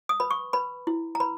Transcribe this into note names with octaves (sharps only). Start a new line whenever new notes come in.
D#6
B4 B5
C#6
B4 B5
E4
A#5
B4 B5